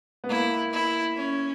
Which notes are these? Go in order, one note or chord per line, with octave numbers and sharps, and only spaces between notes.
B3
A#3 E4
E4
C#4